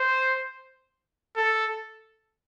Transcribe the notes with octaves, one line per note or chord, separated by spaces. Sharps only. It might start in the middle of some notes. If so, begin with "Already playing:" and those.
Already playing: C5
A4